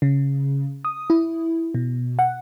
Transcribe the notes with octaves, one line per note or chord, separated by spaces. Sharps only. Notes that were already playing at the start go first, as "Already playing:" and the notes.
C#3
D#6
E4
B2
F#5